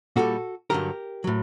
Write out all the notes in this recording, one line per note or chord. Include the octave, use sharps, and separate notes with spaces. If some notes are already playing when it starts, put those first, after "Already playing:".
A#2 G3 F#4 A4
G2 D3 F#3 G4 A#4
A2 F#3